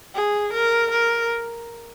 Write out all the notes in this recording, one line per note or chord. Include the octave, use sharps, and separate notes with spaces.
G#4
A#4
A#4